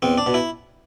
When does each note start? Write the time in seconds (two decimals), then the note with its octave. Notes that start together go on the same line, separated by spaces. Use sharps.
0.02 E2 C4
0.18 D4
0.26 B2
0.34 E4